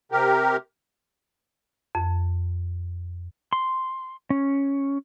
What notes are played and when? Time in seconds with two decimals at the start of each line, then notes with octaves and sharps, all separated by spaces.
0.12 C3 G4 A#4
1.95 F2
3.53 C6
4.30 C#4